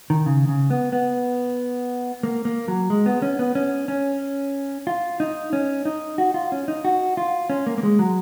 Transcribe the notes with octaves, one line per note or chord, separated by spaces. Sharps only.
D#3
C#3
C#3
B3
B3
A#3
A#3
F#3
G#3
B3
C#4
B3
C#4
C#4
F4
D#4
C#4
D#4
F#4
F4
C#4
D#4
F#4
F4
C#4
A#3
A#3
G#3
F#3